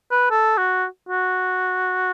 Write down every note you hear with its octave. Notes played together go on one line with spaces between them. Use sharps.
B4
A4
F#4
F#4